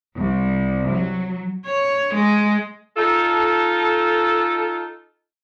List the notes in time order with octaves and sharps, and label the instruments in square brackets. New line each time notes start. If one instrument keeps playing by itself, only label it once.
[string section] C2
F#3
[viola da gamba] C#5
G#3
[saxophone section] D#4 F4 A4